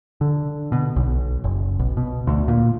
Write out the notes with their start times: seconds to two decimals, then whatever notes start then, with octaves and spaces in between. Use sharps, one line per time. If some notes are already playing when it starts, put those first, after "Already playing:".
0.21 D3
0.72 B2
0.96 B1
1.44 F#1
1.79 B1
1.97 B2
2.27 D2
2.48 A#2